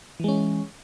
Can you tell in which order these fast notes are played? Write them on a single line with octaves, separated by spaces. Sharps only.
E3 G#3 C#4